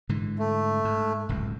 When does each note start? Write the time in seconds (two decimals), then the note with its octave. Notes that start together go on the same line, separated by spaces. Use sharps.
0.09 G#2 D3 E3
0.39 A3
0.85 G#2
1.29 D1 C#2 F#2